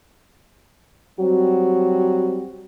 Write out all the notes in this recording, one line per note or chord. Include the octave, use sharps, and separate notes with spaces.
F#3 G3 C4 F#4